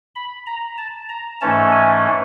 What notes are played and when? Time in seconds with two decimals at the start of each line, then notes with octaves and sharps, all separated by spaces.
0.15 B5
0.47 A#5
0.78 A5
1.09 A#5
1.41 G#2 E3 A3 C#4 A5
1.72 G#5